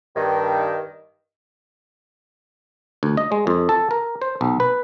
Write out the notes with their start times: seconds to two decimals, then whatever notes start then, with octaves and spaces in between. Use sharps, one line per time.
0.15 G2 D#3
3.03 D2
3.17 D#5
3.32 G#3
3.47 F2
3.69 A4
3.91 A#4
4.22 C5
4.41 B1
4.60 B4